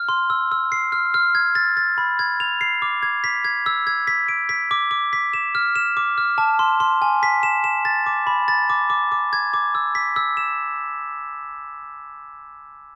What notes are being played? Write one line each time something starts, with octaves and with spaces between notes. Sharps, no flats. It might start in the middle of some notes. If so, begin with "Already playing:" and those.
Already playing: F6
C6
E6
E6
C7
F6
F6
G#6
A6
A6
B5
G#6
F7
C7
D6
G#6
B6
G#6
E6
G#6
B6
D7
B6
D6
D6
B6
E7
F6
E7
D6
F6
A5
C6
C6
G#5
B6
E7
E7
A6
D6
B5
A6
D6
D6
D6
G#6
D6
E6
B6
E6
E7